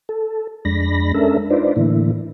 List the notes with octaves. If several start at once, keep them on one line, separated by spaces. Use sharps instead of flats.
A4
F2 G#3 D4 B5 A#6
G#3 C#4 D4 A4 A#4 E5
D4 D#4 F4 B4 C5 D5
A2 D3 E3 A#3 E4